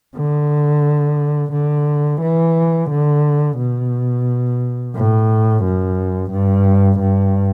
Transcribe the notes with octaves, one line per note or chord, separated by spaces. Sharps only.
D3
D3
E3
D3
B2
A2
F#2
G2
G2